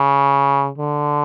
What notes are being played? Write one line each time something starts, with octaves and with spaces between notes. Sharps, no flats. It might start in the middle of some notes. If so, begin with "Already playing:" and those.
Already playing: C#3
D3